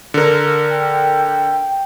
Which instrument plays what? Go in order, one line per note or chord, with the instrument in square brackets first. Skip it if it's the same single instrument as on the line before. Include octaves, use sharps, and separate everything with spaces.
[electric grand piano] D3 A#4
[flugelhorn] G5